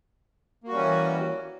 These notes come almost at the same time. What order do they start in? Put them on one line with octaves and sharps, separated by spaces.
A#3 F#4 G3 C#4 E3